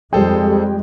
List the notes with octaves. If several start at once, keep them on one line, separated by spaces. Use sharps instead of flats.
F2 G3 G#3 G#4 A4 C5 G5